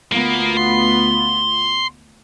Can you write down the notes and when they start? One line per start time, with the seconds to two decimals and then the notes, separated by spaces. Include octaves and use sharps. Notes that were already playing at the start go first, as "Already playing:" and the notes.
0.12 D2 A#3 B3 F4
0.57 C6